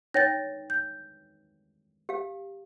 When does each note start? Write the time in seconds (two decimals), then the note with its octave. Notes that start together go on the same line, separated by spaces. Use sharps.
0.14 D#4 C#5 G5 A6 A#6
0.70 G6
2.09 G4 F5